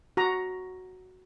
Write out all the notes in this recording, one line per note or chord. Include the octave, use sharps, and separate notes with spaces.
F#4 A#5